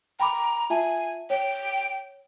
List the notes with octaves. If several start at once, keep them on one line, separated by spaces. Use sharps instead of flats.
G5 A#5 B5 D6
F4 E5 G#5 A5
C#5 G5